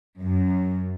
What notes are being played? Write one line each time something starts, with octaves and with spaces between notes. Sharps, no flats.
F#2